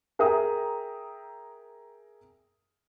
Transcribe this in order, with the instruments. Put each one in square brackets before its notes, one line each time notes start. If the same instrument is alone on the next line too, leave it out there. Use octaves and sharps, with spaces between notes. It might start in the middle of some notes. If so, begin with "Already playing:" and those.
[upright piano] G#4 A#4 E5 G5 A#5 D#6